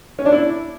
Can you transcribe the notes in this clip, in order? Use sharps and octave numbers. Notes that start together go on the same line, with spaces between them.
C#4
D4
E4